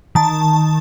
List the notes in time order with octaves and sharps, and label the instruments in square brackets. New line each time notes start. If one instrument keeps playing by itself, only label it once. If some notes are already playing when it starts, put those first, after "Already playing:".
[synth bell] D#3 A5